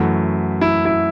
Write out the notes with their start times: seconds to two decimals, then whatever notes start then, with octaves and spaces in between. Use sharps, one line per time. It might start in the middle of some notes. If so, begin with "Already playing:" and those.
Already playing: F#2 E3 A3 F#4
0.61 E4
0.85 E4